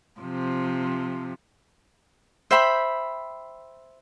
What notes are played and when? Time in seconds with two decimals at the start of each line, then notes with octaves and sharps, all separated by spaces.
0.20 C3 F3
2.51 C5 E5 G5 B5